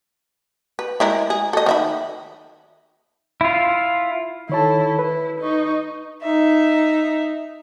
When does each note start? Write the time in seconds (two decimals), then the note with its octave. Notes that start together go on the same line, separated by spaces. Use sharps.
0.79 B4
1.00 G#3 E4 A#4
1.30 G#4
1.53 A4 D#5
1.66 D#3 E5 B5
3.41 E4 F4
4.49 D#3 E4 A4 C#5 A5
4.99 E4 B4
5.40 D#4 C#6
6.22 D#4 E5